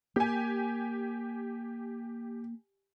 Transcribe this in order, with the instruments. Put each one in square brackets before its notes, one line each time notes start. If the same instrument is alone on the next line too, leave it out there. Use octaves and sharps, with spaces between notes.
[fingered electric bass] A#3 [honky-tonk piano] G4 G#5